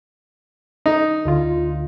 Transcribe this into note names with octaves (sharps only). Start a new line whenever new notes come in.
D#4
D2 D3 F4